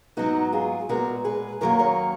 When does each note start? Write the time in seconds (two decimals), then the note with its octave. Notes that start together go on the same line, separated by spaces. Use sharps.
0.17 G#2 F#3 B3 D#4 F#4
0.53 F4 G#4
0.89 A#2 G#3 B3 F#4 A#4
1.24 G#4 B4
1.61 F#2 D#3 F#3 A#3 A#4 C#5
1.79 A#4 C#5